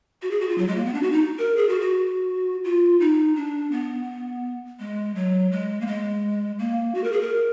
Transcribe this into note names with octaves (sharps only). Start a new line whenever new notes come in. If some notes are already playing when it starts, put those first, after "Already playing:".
F#4
G#4
F#4
F4
F#3
G#3
A#3
B3
D4
F#4
D#4
A#4
G#4
F#4
F#4
F4
D#4
D4
B3
G#3
F#3
G#3
A#3
G#3
A#3
F#4
A#4
G#4
A#4